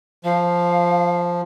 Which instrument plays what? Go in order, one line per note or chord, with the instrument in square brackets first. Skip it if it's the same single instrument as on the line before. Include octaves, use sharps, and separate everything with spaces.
[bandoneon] F3 [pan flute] F5